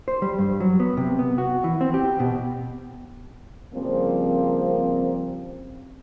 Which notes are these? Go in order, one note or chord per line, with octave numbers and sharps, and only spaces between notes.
C5
G3
G2
F#3
B3
C3
B3
F#4
E3
C4
G4
B2
C#3 F3 G3 A#3 C4